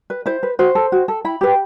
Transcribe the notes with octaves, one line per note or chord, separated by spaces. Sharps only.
B4
E4 C5
B4
F#4 C5
A4
F#4
A4
E4 B5
G4 B4